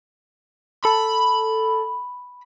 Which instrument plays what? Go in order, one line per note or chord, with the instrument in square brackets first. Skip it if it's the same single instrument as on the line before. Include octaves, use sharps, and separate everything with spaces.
[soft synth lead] A4 [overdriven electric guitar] B5